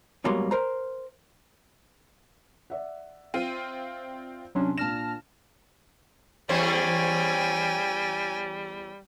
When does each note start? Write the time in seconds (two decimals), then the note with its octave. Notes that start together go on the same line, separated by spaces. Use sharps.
0.24 G#2 B2 F#3 G3 A#3 C6
0.51 A#4 C5 A#5
2.70 D5 E5 F#5
3.34 C4 F4 D#7
4.55 C2 F#3 C#4 D4 C6
4.78 A#2 D4 A5 F6 A#6 E7
6.49 E2 G3 C#4 C5 G5 G#5